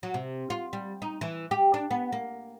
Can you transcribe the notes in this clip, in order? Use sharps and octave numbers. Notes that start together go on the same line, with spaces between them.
F#3
C3
F4
G3
D#4
E3
G4
D4
B3
A#3